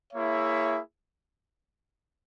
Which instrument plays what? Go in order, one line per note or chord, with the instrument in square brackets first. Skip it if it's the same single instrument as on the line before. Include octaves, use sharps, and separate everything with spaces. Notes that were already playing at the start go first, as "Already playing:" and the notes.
[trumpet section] A#3 E4 G#4 C#5 E5